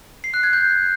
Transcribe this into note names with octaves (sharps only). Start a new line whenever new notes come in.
C7
F#6
G#6
G6